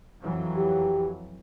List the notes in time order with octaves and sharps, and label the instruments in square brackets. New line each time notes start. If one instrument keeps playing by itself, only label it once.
[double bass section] F2 E3 F#3
[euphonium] G4